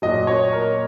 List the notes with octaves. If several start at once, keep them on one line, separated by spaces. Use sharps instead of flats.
A#2 F#3 D#5
C#5
A#4